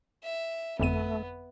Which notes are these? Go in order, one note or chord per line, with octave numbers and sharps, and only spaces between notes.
E5
G1 F2 A3 B3 D#7